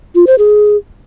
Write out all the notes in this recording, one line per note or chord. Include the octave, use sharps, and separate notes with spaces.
F4
C5
G#4